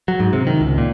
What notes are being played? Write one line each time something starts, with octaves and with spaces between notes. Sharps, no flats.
F#3
G#2
C3
D#3
C#2
A#2